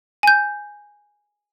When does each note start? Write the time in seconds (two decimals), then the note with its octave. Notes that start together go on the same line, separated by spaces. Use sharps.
0.23 G#5 G6